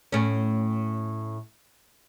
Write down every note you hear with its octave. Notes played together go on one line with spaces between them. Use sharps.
A2 C#4